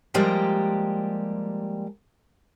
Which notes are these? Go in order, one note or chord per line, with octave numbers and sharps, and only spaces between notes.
F3 G3 G#3 A#3 G4